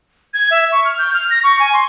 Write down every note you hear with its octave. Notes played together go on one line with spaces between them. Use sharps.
G#6
E5
C#6
F6
G6
F6
A#6
C#6
G#5
C6